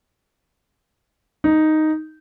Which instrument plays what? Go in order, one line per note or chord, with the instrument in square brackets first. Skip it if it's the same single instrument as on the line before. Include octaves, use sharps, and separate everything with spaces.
[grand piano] D#4